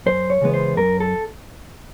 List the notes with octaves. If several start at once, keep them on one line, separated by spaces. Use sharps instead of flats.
F#2 C5
C#5
C#3 E3 G#3 B3
C5
F#2 A#4
A4